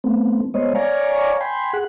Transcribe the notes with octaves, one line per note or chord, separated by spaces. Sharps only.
A3 B3 C4
G#3 B3 C5 C#5 D#5
C#5 D5 F5 G#5 A#5 C#6
G5 G#5 B5 C6
G#4 F#5 F#6